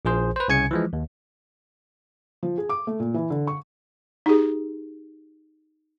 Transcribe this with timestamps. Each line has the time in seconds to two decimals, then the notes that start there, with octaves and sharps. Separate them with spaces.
0.05 A#1 F3 G#4 C5
0.36 B4 C5
0.48 C2 C#3 G#5 G#6 C#7
0.71 E3 F3 G#3
0.93 D#2
2.43 F3
2.58 G#4
2.69 D6
2.87 A3
3.00 A#2
3.14 E3
3.30 D3
3.47 C#6
4.26 D#4 G4 G#4